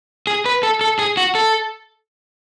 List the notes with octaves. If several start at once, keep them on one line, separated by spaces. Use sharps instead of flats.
G#4
B4
A4
A4
G#4
F#4
A4